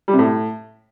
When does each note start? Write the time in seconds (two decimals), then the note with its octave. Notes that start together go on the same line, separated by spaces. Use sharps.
0.08 G3
0.13 C3
0.19 A2